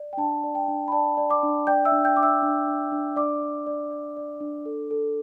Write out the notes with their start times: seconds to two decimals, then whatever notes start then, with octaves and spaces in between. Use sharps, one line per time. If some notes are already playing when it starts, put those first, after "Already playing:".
Already playing: D5
0.13 G5
0.17 D4 A5
0.43 D5
0.55 G5
0.68 D4
0.88 B5
0.92 D5 A5
1.17 D5
1.29 D5 D6
1.43 D4
1.67 D5 G5 G6
1.85 E5 E6
1.92 D4
2.05 G5 G6
2.16 D4 D6
2.23 E5 E6
2.43 D4
2.67 D4
2.92 D4
3.16 D4 D5 D6
3.42 D5
3.67 D5
3.91 D5
4.17 D5
4.41 D4
4.66 A4
4.91 A4